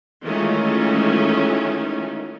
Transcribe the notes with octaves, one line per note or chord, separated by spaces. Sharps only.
D#3 E3 G#3 A3 C#4 F4